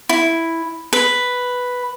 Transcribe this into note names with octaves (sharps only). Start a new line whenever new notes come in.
E4
B4